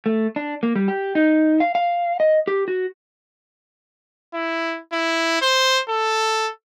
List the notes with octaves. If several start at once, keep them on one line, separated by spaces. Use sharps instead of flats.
A3
D4
A#3
G3
G4
D#4
F5
F5
D#5
G4
F#4
E4
E4
C5
A4